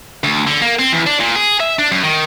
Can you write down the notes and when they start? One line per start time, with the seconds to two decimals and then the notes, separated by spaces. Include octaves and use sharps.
0.24 D2
0.47 D3
0.62 A#3
0.79 C4
0.92 E2
1.06 D4
1.20 A#2
1.36 G#4
1.60 E5
1.79 D4
1.91 F#2
2.03 D#3